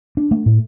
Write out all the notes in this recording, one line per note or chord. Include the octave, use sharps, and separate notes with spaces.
D4
A3
A2